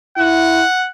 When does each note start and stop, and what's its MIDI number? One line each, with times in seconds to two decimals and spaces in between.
0.18 0.64 64
0.18 0.87 78